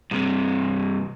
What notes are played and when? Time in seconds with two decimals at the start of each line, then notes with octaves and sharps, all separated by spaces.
0.11 G2 C3